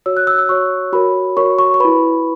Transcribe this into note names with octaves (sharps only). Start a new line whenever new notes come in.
F#4 C#5 E6
F#6
E6
E6
F#4 C#5 C#6
F#4 A#4 C#5 B5
F#4 A#4 C#5 C#6
C#6
C#6
E4 B4 B5